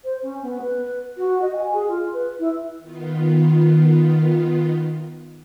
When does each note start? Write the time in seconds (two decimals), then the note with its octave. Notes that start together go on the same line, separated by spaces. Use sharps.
0.04 C5
0.22 C#4
0.42 B3
0.61 B4
1.17 F#4
1.42 D#5
1.56 G#5
1.73 G#4
1.88 F4
2.13 B4
2.39 E4
2.79 D#3 B3 F4